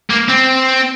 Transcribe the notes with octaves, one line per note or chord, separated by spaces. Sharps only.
A#3
C4